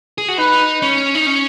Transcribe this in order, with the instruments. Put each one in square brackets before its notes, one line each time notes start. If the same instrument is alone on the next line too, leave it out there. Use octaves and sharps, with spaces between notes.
[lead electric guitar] G#4
F#4
[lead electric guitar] D#4 [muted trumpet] B4
[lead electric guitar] C#4
D#4
C#4